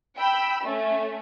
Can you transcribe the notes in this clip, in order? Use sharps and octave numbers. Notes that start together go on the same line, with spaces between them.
G5 B5 E6
A3 C#4